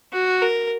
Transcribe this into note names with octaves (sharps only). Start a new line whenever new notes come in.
F#4
A#4